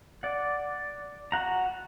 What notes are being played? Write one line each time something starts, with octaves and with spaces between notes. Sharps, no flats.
D5 F#5
F#4 F#5 A#5